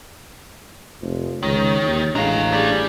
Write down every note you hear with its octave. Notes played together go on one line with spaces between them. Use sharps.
F1 F3
C#2 D#3 C#5
D#2
A1 G#3 D4 F5 F#5 A#5
G4 G#4 D5